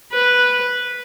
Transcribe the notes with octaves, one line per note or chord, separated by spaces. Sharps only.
B4